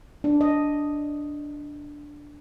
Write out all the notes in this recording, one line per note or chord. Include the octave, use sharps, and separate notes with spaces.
D4
D#5